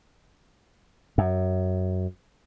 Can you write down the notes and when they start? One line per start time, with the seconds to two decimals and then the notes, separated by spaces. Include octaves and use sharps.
1.18 F#2